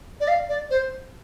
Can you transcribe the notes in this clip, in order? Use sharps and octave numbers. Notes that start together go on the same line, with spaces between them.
D5
F5
D5
C5